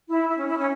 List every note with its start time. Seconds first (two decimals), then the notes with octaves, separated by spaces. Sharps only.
0.08 E4
0.28 E4
0.38 C#4
0.47 E4
0.57 C#4